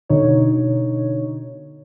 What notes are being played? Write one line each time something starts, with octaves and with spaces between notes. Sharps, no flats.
B2 D3 D#4 C#5